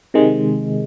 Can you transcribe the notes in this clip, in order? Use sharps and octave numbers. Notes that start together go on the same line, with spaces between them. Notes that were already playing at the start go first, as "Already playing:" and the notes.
C3 D#3 G#3